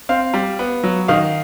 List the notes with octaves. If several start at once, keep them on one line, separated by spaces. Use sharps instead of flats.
C4 F5
G3
B3
F#3
D#3 F5